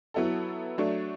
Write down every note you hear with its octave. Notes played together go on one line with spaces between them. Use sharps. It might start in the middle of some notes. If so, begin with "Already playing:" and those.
F#3 B3 E4 A4
F#3 A3 D4